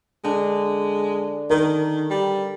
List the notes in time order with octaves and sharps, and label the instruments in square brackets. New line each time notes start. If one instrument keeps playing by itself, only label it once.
[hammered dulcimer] D3 [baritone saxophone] G#3
[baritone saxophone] D#3 [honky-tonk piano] A#4
[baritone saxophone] G3